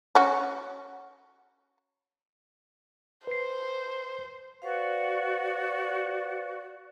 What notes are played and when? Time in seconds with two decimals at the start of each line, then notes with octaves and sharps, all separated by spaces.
0.15 C#4 F#4
3.27 B4 C5 C7
4.62 F#4 B4 C5 D5 F5